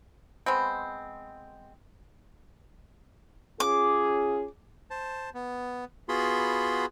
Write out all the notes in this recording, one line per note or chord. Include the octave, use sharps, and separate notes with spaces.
G#3 B3 C4
C#4 F4 G#4 D6
C5 A5
B3
B3 F4 F#4 G#4 B5 C6